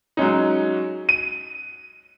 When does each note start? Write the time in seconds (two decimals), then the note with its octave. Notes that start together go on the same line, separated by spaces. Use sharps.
0.17 F#3 G#3 C#4 D#4
1.09 D#7